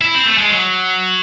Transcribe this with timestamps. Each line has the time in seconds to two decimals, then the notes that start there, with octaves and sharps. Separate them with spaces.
0.01 E4
0.14 C4
0.26 A3
0.38 G#3
0.49 F#3